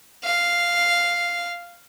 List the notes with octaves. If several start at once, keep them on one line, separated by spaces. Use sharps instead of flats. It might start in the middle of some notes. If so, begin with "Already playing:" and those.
F5